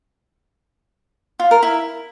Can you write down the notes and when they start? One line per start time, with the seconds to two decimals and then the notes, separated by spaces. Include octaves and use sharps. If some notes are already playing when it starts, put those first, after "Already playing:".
1.40 F4
1.51 A#4
1.63 E4